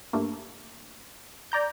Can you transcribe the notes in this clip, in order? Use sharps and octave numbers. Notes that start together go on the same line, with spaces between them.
G2 A3 A#3
D5 A#5 G6